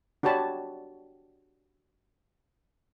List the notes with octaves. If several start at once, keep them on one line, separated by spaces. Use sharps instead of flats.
D4 F#4 G4 C#5 A5 B5